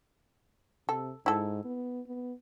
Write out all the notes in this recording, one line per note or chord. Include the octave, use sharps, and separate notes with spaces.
C3 A4
G#2 E4 A4
B3
B3